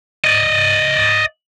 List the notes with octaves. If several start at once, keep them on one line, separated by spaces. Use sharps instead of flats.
D5 D#5